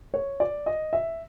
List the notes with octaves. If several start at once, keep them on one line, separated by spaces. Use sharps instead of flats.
C#5
D5
D#5
E5